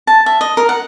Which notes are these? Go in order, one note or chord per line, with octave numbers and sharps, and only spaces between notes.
A5
E5
D#5
A#4
F#5